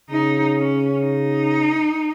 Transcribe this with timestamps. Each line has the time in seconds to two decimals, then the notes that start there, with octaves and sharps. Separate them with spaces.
0.10 C#3 D#4
0.58 C#4
1.04 D#4